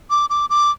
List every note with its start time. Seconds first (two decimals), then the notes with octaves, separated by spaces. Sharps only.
0.10 D6
0.30 D6
0.50 D6